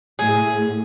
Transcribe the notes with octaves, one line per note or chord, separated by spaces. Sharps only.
A2 G#4